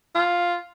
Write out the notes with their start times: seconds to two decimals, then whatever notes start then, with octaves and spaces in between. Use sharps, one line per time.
0.15 F4